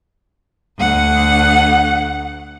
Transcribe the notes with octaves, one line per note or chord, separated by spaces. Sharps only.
D2 F#5